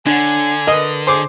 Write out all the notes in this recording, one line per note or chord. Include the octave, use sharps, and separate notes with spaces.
D3 D4 C#5 F#5 G#5
A#4 B4 D#5
G#4 C5 D6